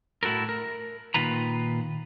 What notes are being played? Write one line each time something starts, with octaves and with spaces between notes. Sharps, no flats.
A2 E4 F#4 A4 A#4
A#4
A#2 D#3 F4 B4 A#5